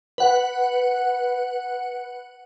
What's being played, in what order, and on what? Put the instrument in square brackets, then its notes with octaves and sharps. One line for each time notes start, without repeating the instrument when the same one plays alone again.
[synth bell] B4 F#5